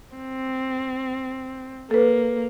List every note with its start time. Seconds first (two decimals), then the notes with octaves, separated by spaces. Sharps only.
0.16 C4
1.91 A#3 A4 B4